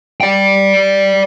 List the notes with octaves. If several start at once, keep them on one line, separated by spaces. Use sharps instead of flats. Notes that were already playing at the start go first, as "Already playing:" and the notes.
D5 G5